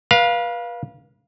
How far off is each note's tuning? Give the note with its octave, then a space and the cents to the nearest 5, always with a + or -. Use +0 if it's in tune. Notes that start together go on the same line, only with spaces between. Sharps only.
B4 -35 F5 +0